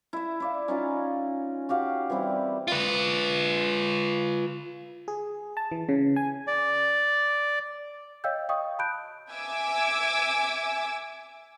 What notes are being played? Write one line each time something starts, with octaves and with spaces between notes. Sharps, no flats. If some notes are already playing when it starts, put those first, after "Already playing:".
E4 E5
E4 D5 F5
C#4 D#4 F4 G#5
F#4 G4 F5 F#5
E3 G3 C4 E4
F4 B4
G#4
A5
E3
C#3
G#5
D5
C#5 D#5 F5 G5 E6 G6
D#5 F5 G5 C#6 D#6
A5 B5 F#6 G6 D7
E5 G#5 D6 E6